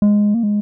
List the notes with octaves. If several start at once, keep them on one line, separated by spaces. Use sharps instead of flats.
G#3
A#3
G#3